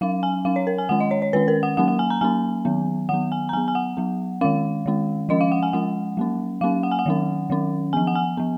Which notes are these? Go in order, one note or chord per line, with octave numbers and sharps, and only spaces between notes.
F#3 C#4 F5
G#5
F#3 C#4 F5
C#5
A#4
G#5
D#3 G#3 C#4 F#5
D#5
C#5
C#5
D#3 G#3 C#4 B4
A#4
F#5
F#3 A#3 C#4 F#5
F#5
G#5
A#5
F#3 A#3 C#4 G#5
D#3 F#3 B3
D#3 F#3 B3 F#5
G#5
A#5
F#3 B3 G#5
G#5
F#5
F#3 B3
D#3 G#3 C#4 F5
D#3 G#3 C#4
F3 G#3 C#4 D#5
F5
F#5
G#5
F3 G#3 C#4 F#5
F#3 A#3 C#4
F#3 A#3 C#4 F5
F#5
G#5
F#5
D#3 F#3 C#4
D#3 F#3 C#4
F3 B3 G#5
F#5
G#5
F3 B3